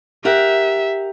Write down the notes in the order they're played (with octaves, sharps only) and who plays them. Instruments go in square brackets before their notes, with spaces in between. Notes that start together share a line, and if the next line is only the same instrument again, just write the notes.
[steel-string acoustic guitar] G4 A#4 F#5 [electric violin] E5